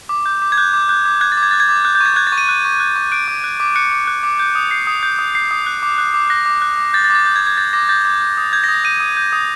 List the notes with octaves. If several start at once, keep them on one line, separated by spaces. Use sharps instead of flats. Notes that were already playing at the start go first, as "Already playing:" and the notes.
D6
G6
D6
G#6
F#6 G6
D6
F#6 G6
D6
F#6 G#6
A6
D6
G#6
F#6 A6
G#6
D6
F#6 G6
G6
C#6
G#6
F#6 G#6
A6
C#6
D#7
F#6
C#6
F#6
C#6
F#6 D7
D6
F#6
D6
F#6 C#7
D6
F#6
D6
G6
D#6
G6 C7
D#6
G6
D#6
G6 C7
D#6
F#6
D6
F#6
D6
F#6 A#6
D6
F#6
D6
G6 A6
A6
D6
A6
G6
G#6
D6
G#6
G6 A6
D6 A#6
G6 A6
D6
G6
D#6
G6 G#6
A#6
D#6
A#6
G6 D#7
D#6
G6
D#6